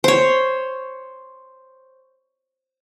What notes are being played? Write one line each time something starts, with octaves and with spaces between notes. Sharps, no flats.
C5 C#5